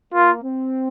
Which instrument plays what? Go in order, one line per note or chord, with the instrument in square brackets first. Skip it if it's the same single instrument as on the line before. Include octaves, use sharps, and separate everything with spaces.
[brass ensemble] A#3 [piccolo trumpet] F4
[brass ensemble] C4